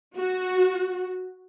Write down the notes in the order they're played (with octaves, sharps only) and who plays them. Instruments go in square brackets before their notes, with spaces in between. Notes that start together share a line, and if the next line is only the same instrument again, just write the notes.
[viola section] F#4